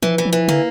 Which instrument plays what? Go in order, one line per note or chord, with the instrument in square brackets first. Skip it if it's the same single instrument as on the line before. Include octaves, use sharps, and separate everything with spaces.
[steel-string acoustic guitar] E3 [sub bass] F3
[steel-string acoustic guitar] E3
[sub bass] F3
[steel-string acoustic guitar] E3
[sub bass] D3 [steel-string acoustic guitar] A#3